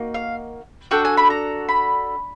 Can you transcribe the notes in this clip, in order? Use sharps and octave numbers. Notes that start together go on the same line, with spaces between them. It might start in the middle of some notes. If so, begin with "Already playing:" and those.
Already playing: A#3 D#4 F#4
F5
D4 F#4 A4 G5
G#5
B5
A#5
B5